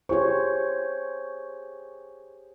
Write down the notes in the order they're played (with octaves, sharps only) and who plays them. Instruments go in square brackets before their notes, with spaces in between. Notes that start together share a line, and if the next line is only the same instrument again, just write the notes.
[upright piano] G4 G#4 C#6 [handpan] C5 C#5